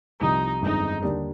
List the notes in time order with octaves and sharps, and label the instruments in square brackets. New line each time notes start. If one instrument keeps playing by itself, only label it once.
[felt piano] C2 C3 F3 [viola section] D#4
[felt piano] G1 F2 D#3 G#3 C4 [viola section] D#4
[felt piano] D#2 D3 G3 D4